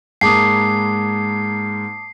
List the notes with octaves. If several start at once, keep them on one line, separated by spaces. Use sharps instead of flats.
G#2 G#3 A#3 A5 D6 D#6 C7